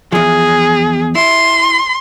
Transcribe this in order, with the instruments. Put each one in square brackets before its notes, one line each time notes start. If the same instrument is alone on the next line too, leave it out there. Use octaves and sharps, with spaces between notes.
[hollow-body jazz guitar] E2 F3 [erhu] G#4
[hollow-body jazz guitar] E4 [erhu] C6